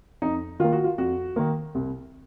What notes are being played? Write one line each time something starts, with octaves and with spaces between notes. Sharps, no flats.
F2 D#4
D#3 A#3 F4
F#4
F4
F2 F#4
D#3 A#3
C2